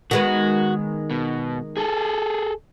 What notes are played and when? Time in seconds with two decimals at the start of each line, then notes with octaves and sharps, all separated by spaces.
0.11 D#3 G#3 B3 F#4
1.11 B2
1.77 G#4 A4